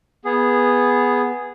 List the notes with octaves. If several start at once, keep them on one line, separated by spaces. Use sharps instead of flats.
B3 G#4